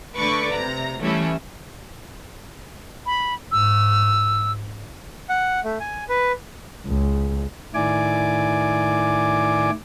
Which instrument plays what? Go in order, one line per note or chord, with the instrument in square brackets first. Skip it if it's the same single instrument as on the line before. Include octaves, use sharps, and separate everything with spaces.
[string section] D3 A3 B4 D5 C#6 D6
C3 A#5
E3 G3 A3 C#4 E4
[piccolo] B5
[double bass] G#2 [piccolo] E6
[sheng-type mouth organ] F#5
A3
G#5
B4
[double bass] C#2
[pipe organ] A2 D#3 E4 D5 G#5 D6